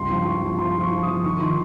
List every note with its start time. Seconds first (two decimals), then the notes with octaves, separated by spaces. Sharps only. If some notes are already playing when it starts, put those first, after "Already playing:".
Already playing: C#2 G2 C6
0.09 F3
0.25 F3 C#6
0.42 F3
0.59 F3 C6
0.75 F3
0.81 C#6
0.91 F3
1.03 D#6
1.08 F3
1.24 D#3 C#6
1.41 D#3 C6